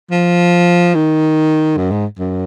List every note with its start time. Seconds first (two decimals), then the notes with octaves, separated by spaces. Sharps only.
0.11 F3
0.94 D#3
1.77 F#2
1.91 G#2
2.19 F#2